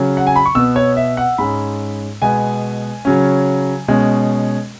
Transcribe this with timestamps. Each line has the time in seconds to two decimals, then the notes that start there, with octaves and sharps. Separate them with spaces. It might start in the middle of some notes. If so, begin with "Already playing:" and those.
Already playing: C#3 F#3 C#4
0.17 F#5
0.27 G#5
0.36 B5
0.46 C#6
0.55 B2 B3 E6
0.76 C#5
0.97 E5
1.17 F#5
1.38 G#2 G#3 C#4 B5
2.22 B2 G#3 B3 G#5
3.05 C#3 F#3 C#4
3.88 B2 G#3 C#4